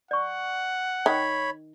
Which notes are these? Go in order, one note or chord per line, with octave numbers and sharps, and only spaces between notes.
D5 F#5 C#6
D#3 C#5 B5